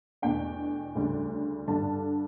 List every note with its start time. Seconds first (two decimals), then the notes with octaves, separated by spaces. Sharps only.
0.22 E2 B2 A3 D4 G5
0.95 D2 C#3 G3 D4
1.67 G2 D3 G3 D4 A5